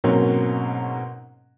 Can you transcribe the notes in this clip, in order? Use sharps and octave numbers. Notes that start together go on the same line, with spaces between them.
G#2 B2 F#3 A#3 C4 C#4